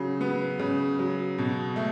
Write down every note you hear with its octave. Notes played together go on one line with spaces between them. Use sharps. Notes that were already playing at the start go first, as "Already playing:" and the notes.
Already playing: C#3 F#3
B3
C#3
F#3
B2
A3